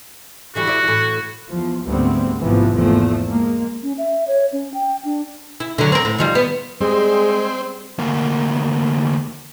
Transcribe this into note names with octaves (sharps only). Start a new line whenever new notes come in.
D3 E3 G3 F#4
E4 D5
A2 E3
E2 F3
D2 G#2 G3 A3 B3 C4
A1 G#2 C3 E3 F3 B3
G#1 E2 F3 A3 A#3
G#3 A#3
C#4
E5
C#5
C#4
G5
D4
E4
D3 F#3
C4 A#4
A2
D#3 F3 G3
B3
G3 G#3 C4 G#4
D2 A#3